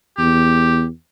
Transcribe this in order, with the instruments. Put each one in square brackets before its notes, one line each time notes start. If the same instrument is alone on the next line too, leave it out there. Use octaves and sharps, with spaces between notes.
[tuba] E2 [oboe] G4